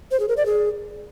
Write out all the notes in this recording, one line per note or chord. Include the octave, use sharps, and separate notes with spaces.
C5
G#4
A#4
D5
G#4